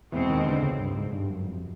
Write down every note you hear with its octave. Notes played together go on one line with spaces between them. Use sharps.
E2 B2 E3 G#3 C4
D#2 D#3
D2 D3
C#2 C#3
G2
G#2
G2
F#2
F2